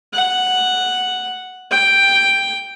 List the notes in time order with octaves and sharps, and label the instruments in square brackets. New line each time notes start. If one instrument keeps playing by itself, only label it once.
[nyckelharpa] F#5
G5